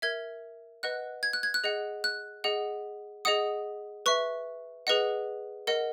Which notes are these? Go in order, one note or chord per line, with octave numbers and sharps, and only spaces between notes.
A#4 E5 G#6
B4 D#5 F#5 F#6
G#6
F#6
G#6
F#6
G#4 D#5 F#5
F#6
G#4 D#5 F#5
G#4 D#5 F#5 D#6
B4 E5 C#6
G#4 B4 D#5 F#5
A#4 D#5 F#5